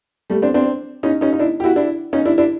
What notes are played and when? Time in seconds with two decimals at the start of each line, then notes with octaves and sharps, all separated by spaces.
0.30 G3 A3
0.42 C4 D4
0.54 C4 D4
1.03 C#4 D#4
1.21 C#4 D#4
1.33 D#4
1.39 D4 E4
1.60 G4
1.64 E4 F#4
1.76 D4 E4
2.13 C#4 D#4
2.25 D4 E4
2.38 D4 E4